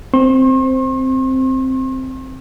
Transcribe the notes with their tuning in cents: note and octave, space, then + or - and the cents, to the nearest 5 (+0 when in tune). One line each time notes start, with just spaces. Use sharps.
C4 +0 C6 +45